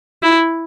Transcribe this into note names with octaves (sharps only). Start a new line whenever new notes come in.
E4